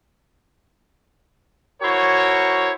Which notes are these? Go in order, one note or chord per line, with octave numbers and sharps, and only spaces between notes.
E4 F#4 A#4 C5 C#5